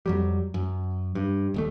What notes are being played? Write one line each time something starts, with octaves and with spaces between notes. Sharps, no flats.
F2 F#3 G3
F#2
G2
D#1 D#2 A3